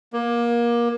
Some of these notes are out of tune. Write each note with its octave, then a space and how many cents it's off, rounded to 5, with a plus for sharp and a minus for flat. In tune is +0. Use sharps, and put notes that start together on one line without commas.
A#3 +25